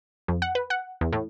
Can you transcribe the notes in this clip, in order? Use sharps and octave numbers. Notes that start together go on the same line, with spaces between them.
F2
F#5
B4
F#5
E2
A2